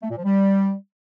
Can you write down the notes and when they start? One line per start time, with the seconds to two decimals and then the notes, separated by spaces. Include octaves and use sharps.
0.03 A3
0.10 A#2
0.17 F3
0.24 G3